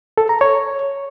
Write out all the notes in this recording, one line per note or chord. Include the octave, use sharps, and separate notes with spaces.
A4
A#5
C#5